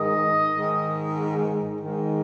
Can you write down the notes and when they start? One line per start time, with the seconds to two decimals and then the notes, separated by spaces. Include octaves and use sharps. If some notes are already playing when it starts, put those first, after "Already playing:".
Already playing: G#2 D#3 D#5
0.54 G#2 D#3
1.80 G#2 D#3